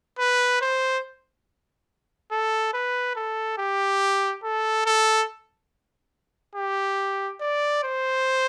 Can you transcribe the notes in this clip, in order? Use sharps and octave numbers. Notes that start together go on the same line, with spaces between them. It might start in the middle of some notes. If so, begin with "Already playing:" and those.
B4
C5
A4
B4
A4
G4
A4
A4
G4
D5
C5